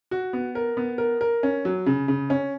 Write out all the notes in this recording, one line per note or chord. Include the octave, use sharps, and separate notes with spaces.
F#4
B3
A#4
B3
A#4
A#4
C#4
F#3
C#3
C#3
C#4